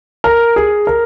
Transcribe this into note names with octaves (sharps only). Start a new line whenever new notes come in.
A#4
G#4
A#4